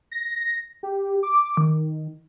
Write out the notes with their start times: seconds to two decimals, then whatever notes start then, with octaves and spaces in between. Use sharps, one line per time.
0.11 A#6
0.83 G4
1.23 D6
1.57 D#3